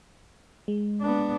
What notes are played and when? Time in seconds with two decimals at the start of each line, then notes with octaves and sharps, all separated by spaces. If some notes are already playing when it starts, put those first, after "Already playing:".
0.68 G#3
1.01 B3 D4